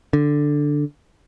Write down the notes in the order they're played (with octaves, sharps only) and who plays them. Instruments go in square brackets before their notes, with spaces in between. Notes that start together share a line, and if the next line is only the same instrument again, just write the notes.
[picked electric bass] D3